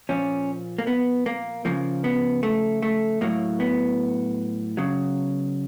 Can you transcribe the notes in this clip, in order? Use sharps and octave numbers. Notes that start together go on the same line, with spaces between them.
A#2 F3 C#4
A#3
B3
A#3
C#3 F3 A#3
B3
A3
A3
A2 F#3 A#3
B3
C#3 F#3